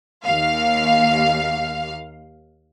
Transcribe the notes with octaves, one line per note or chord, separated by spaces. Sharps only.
D#2 F5